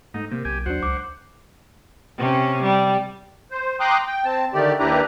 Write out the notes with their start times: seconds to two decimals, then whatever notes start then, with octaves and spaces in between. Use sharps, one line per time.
0.14 G#2 A3 D#4
0.31 C3 A#3
0.45 B1 G4 G#5
0.66 D#2 F#3 D4 C5 F#5
0.83 C#2 D6
2.18 C3 C#4
2.63 G3
3.51 C5
3.80 G5 A#5 C6 D6 D#6 F#6
4.06 G5
4.25 C4 A5
4.54 D3 D#3 A3 G4 D5
4.79 D#2 D4 E4 G4 B4 A#5